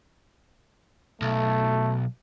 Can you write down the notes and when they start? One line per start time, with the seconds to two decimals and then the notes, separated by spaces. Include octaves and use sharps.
1.22 B1 A3